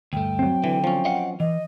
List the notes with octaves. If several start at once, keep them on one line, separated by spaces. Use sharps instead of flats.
D2 G2 A3 G5
F#3 C4
D3 E3
F3 C#4
D#5 F5 F#5
E3 D#5